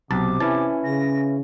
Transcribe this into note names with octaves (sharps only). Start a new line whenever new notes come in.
B1 C3 A5 D6
E3 C#4 E4 A5
C#3 A#6